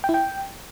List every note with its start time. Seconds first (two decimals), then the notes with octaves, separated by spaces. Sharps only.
0.04 G5
0.09 E4
0.14 G5